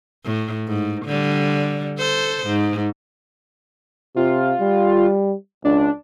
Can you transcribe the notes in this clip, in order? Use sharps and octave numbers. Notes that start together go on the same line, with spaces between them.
A2
G#2
D3 G3
A4 C5
G#2
C3 F4
G3
C#2 D4